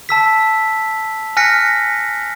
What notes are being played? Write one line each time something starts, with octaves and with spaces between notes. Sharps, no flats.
A5 E6 B6
G#5 F6 F#6 A#6 B6 C#7